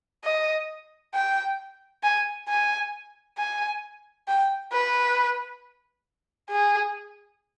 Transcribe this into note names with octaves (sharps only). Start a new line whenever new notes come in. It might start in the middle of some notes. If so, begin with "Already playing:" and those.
D#5
G5
G#5
G#5
G#5
G5
B4
G#4